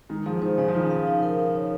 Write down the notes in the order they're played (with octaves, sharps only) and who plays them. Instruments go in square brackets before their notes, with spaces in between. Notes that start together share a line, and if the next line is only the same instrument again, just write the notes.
[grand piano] D#3 [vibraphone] G#3
[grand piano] F3 [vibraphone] G#4
[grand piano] D#3 [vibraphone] C5
[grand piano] C#3 [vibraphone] D#4
[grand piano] F3
[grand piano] D#3 [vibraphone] D#4
[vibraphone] F5
D#4
A#4
D#4
C#5